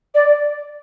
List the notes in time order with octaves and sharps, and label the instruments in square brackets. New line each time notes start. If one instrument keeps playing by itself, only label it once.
[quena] D5